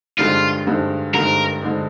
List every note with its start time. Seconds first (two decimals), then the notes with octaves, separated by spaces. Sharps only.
0.18 G2 D3 G#3 C4 D#4 F4
0.66 G2 D3 G#3 C4 D#4
1.14 G2 D3 G#3 C4 D#4 A#4
1.62 D3 G#3 C4 D#4